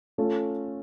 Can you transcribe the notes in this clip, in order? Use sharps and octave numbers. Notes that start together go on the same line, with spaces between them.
A3 C#4 F4 A4